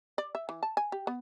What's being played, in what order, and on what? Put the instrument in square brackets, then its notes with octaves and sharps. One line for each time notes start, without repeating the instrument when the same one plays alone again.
[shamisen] D5
E5
E3
A5
G#5
G4
B3